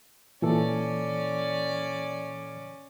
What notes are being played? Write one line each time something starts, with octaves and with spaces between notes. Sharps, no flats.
A#2 E3 C#4 A4 D5